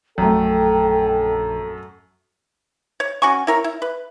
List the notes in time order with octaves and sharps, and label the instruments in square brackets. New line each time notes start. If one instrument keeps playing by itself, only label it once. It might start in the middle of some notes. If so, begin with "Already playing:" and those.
[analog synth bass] A#1 [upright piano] F#2 A3 [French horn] A4 [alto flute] G5
[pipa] C#5
C#4 F#4 G#5 C#6
E4 A#4 C#5
E4
B4